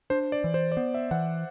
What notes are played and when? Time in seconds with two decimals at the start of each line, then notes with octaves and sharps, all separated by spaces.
0.10 D4 C5
0.32 D5
0.44 E3
0.54 C5
0.72 D5
0.77 B3 C5
0.94 E5
1.11 E3 F#5